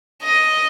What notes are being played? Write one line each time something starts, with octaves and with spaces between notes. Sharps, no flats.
D#5